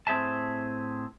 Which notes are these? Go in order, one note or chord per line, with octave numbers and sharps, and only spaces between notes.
A2 C4 G#4 E5 A5